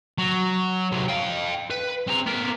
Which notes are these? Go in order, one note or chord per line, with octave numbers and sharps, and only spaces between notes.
F#3
C3 F#3
F5 G5
B4
C4 A#5
B3 A#4